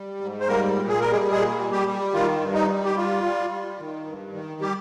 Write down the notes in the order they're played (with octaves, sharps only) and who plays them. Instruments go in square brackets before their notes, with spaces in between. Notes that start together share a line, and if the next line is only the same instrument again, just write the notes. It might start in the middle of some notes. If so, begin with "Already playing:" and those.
Already playing: [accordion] G3
G#2
C5
G3 A#3 A#4
A#2
G#4
G3 A#4
G#3 G#4
A#2 G#3 G#4
G3
G3 G4
G3
D#3 F4
G2
D#4
G3
G4
G3 F4
G3
G3
D#3
G2
D#3
G3 G4